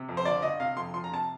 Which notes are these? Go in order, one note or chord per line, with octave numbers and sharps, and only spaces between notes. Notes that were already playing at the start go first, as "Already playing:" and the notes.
Already playing: C3
F2
C5
G1 D5
G1 D#5
C3 F5
F2 C6
F3 C6
A#5
C3 A5